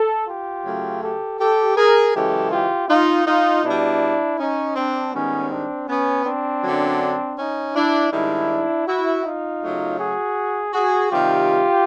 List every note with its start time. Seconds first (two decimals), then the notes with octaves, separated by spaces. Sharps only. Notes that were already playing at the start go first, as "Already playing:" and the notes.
Already playing: A4
0.27 F4 G4
0.65 F#2 C#3 F#3 A3
1.02 G4 A4
1.39 G4 A4
1.76 G#4 A#4
2.14 F#2 C#3 E3 G#3 G4 A4
2.52 F4 G4
2.89 D#4 F4
3.26 D#4 F4
3.63 B2 G3 D4 E4
4.38 C#4 D#4
4.76 C4 D4
5.13 G#2 D#3 G3 B3 C#4
5.51 C4 D4
5.88 B3 C#4
6.25 C4 D4
6.63 F#2 D3 F#3
7.37 C#4 D#4
7.75 D4 E4
8.12 G#2 D#3 G3 D4 E4
8.87 E4 F#4
9.25 D#4 F4
9.62 C#3 F#3 A3
9.99 F#4 G#4
10.74 F#4 G#4
11.11 C3 D#3 G3 F4 G4